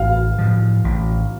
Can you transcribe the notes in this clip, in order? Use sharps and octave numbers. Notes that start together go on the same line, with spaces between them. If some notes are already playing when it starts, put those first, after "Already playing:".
Already playing: A1 F5
A2 F3
A1